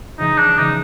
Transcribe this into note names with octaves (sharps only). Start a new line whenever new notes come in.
C#3 E3 G#3 D#4
D4
C#3 E3 G#3 D#4